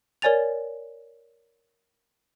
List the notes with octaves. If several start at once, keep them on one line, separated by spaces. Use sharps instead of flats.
A#4 C#5 D5 G#5 A6 F7